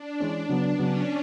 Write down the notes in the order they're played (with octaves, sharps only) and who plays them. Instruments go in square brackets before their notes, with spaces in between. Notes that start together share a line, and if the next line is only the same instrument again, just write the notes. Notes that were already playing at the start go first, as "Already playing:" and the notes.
Already playing: [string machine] D4
[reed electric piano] E3 G#3 C#4
C#3 F#3 B3
[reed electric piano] C#3 F#3 B3 [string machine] C#4